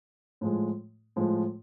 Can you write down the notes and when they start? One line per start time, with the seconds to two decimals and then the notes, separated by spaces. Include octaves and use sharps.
0.41 A2 F3 G#3
1.16 A2 F3 G#3